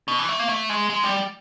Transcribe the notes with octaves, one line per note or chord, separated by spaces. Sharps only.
B2
E3
A3
A#3
A3
G#3
G#3
G3